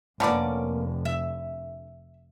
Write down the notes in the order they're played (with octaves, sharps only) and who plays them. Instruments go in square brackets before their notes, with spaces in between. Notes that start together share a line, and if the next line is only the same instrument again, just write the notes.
[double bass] F1 [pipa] D3 B3 D5 [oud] A#3 C#4
[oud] E5